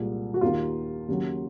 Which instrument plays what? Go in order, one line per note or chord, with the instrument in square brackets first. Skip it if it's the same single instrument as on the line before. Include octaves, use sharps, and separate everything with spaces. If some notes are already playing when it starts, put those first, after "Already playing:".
Already playing: [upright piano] C2 A#2 G#3
F#4
D#2 D#3 A#3 F4
D#2 C#3 F#3 A#3